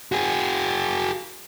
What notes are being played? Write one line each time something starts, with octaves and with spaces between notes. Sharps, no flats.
F#4 G#4